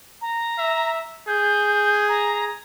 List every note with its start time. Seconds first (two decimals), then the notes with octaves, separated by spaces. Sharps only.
0.21 A#5
0.58 E5
1.28 G#4 G6
2.09 A#5